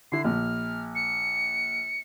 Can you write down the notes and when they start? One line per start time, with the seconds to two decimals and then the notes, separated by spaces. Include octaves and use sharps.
0.12 D3 E4 C7
0.24 A#1 A#2 F6
0.95 C#7